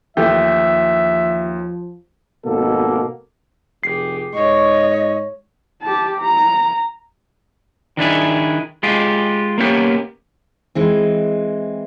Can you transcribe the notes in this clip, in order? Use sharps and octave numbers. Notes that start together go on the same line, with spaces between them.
D#2 E3 F3 A3 G4 E5
G#1 B2 A#3 A4
F1 G4 G#4 C7
G#2 C#5 D#5 C#6
G4 A5
A#5
D#3 D4 E4 G#4
G#3 F4 G4 G#4
A#3 B3 C#4 D#4 G4
E3 G#3 C4